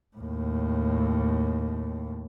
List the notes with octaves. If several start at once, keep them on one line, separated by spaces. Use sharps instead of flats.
D#2 A2